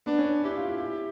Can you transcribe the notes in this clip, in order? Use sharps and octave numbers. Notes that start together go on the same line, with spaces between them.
B3 D4
C#4
E4 G4
F4
E4
E4